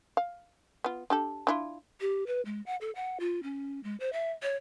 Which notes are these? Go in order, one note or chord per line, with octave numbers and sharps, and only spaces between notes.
F5
B3 F4
D4 G4 A4
D4 E4 F4
G4
B4
G#3
F#5
A4
F#5
F4
C#4
G#3
C5
E5
C#5